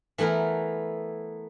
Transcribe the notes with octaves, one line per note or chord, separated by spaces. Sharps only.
E3 A3 B3 E4 A#4